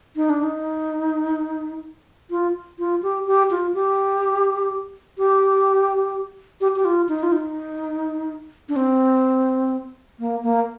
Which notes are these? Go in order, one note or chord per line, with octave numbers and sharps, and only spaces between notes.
D#4
D4
D#4
F4
F4
G4
G4
F4
G4
G4
G4
G4
F4
D#4
F4
D#4
D4
C4
A#3
A#3